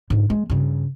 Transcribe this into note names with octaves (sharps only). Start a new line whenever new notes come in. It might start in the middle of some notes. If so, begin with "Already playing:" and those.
G#2 D3
G#3
G2 C#3